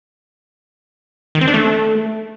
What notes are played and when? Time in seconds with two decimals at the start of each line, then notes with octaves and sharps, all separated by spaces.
1.35 D#3
1.41 C4
1.48 D4
1.54 A3